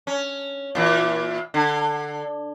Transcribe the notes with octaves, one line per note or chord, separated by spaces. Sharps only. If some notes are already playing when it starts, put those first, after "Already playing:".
C#4
A#2 E3
D3